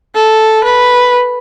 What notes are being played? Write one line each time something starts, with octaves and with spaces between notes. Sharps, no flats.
A4
B4